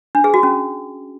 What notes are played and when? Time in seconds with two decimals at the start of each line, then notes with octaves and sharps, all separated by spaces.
0.15 D4
0.24 G#4
0.34 F#4
0.43 C#4